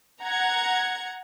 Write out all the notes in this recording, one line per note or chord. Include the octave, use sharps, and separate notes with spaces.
F#5 A#5 G#6